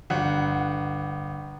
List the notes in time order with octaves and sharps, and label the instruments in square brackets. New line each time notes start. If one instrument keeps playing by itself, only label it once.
[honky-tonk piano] G1 F#5